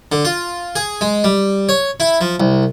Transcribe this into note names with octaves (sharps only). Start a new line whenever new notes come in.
D3
F4
G#4
G#3
G3
C#5
E4
F3
C2